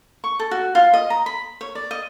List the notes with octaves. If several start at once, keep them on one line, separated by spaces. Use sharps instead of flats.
C#6
A4
F#4
F4
D#5
A#5
B5
C#5
D5
D#5